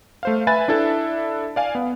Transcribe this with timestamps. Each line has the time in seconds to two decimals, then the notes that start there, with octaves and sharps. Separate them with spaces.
0.23 A3 C5 F5
0.47 B4 E5 G#5 B5 F#6 A6
0.68 D4 E4 A4 E5
1.56 D5 F5 G#5
1.75 B3